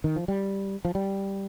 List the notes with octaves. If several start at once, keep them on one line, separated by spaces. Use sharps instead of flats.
D#3
F3
G3
F3
G3